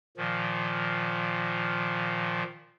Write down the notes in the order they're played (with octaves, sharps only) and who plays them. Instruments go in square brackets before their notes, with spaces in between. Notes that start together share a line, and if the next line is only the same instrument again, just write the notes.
[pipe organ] A#2 D#3 F3